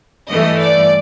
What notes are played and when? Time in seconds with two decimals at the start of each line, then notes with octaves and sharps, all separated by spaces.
0.29 G2 E3 A3 D#5
0.60 D5